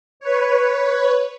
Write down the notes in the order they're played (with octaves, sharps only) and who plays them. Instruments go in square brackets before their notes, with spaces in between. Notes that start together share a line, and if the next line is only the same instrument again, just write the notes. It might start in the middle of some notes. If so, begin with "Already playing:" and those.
[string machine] B4 C#5